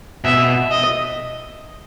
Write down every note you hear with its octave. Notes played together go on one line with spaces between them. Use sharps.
B2 E5
D#5